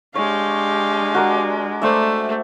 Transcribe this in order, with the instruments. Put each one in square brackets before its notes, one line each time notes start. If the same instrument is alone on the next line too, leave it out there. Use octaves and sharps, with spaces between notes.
[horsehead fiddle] G#3 D4 [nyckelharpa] G4 F5 [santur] C#5
[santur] F#4 A#4 D5
[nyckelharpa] A3 [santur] C5 D5 E5